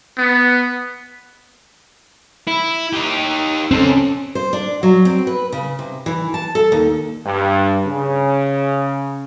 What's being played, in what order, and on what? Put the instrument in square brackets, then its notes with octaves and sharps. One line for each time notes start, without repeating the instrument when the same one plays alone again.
[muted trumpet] B3
[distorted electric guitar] E4
D#4 G4
[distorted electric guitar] C4 A4 [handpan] C#4
[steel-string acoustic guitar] C5
D4
F#3
C4
B4
C#3
C3
E3
A5
A4
D#2
[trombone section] G2
C#3